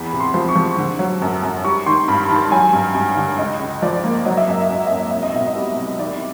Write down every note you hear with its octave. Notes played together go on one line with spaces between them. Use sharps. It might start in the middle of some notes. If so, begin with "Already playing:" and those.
Already playing: E2 B5
C3
C6
F3
C#6
F3
D3
F#3
F#2
F#2
G3 C#6
D#3 C6
G2 B5
D#3 A5
F#3 G#5
G2
G2
D3
C#2 D#5
C#2
F3 D5
A#3
F#3 D#5
E5
F#2 D#5
E5
F#2 D#5
F#2 E5
D#5
C2 E5
D#5
B2 E5
D#5
G3
C2
D#3 D5